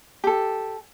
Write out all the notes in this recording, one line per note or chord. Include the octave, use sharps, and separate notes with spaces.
G4 A4